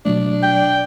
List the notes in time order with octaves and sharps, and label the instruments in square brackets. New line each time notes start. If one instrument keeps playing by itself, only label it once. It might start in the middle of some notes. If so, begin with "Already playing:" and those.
[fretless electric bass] B2 F#3 A3 [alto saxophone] D4
[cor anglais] G5